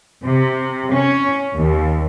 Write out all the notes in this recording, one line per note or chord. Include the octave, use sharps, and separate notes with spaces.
C3
C#4
D#2